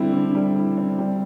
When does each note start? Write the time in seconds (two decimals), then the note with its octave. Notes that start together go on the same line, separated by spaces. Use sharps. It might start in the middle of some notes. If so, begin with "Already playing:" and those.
Already playing: D3 G3 C4 E4
0.13 D3
0.35 G3
0.55 E4
0.77 C4
0.98 G3